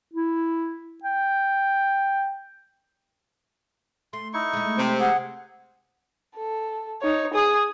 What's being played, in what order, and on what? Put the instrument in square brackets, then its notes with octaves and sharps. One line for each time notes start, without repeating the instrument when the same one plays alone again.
[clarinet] E4
G5
[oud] A3 [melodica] C6
[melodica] D#4 E4 C#6
[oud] G#3 A3
[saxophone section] C3 C4
[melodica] G#4 [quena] F#5
[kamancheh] A4
D#4 C#5
G#4 D#6